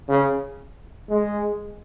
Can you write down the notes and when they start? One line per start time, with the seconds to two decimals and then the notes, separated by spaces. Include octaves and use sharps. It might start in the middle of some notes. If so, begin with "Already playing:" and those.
0.08 C#3
1.09 G#3